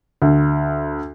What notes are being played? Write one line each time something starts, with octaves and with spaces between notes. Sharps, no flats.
D2